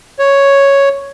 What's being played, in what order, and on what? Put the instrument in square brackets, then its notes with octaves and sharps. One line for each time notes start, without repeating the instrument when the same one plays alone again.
[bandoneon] C#5